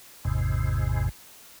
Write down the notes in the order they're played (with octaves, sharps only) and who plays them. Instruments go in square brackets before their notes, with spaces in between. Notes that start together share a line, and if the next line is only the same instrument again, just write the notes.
[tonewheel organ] G#1 E2 G#2 C3